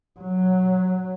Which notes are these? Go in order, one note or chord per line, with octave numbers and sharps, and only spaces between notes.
F#3